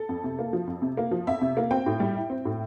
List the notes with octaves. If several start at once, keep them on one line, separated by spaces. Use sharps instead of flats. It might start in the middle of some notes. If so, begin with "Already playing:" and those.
Already playing: A4
F2
C3
A#3
F3
F2
C3
A#3
F3
F2 E5
C3
A#3
C4 G5
A2
G3
E4
C4
A2